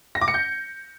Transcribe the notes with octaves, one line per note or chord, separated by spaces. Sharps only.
A#6
D6
C#7
G6